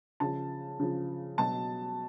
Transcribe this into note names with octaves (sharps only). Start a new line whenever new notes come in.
C#3 F3 A5
C#3 F3
B2 F#3 A5